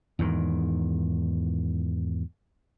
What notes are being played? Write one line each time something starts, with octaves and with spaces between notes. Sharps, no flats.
E2 G#2 D#3